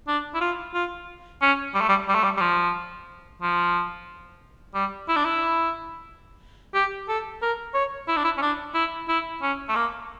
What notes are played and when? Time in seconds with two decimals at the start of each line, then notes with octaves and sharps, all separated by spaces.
0.08 D4
0.34 E4
0.41 F4
0.74 F4
1.42 C#4
1.75 G3
1.81 A3
1.89 G3
2.09 G3
2.15 A3
2.24 G3
2.37 G3
2.41 F3
3.42 F3
4.75 G3
5.08 E4
5.16 D4
5.25 E4
6.74 G4
7.09 A4
7.42 A#4
7.74 C#5
8.08 E4
8.17 D4
8.25 E4
8.38 C#4
8.42 D4
8.75 E4
9.08 E4
9.42 C#4
9.69 A3
9.76 A#3